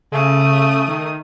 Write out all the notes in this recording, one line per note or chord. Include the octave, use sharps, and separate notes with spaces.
C#3 A3 D#6
D#3